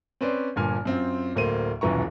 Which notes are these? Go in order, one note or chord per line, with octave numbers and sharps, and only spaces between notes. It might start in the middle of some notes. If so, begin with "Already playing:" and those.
C4 C#4 B4 C5 D5
G1 G2 A#2 G#5 F6
F#2 C4 F4
D1 A2 A#3 C5 D#7
D#1 B1 F#2 E3 A#5 C#6